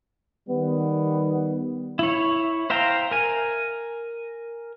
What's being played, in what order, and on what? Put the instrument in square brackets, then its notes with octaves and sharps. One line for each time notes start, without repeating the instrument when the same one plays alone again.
[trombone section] D#3 G3 B3
[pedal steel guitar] E4 C#5
C5 E5 F5 G5 A#5
A#4 G#5